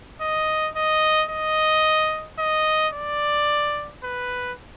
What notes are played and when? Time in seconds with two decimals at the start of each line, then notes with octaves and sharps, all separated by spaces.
0.21 D#5
0.75 D#5
1.30 D#5
2.39 D#5
2.93 D5
4.03 B4